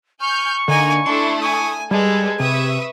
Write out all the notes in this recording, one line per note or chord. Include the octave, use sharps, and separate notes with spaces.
G#5 C#6 F6 G6
D3 A#3 D#4 G#5
A3 D4 E4 A4 C6
G#5 C#6 D#6
G3 G#3 A4 B4 G#6
C3 B4 E5 C#6 D#6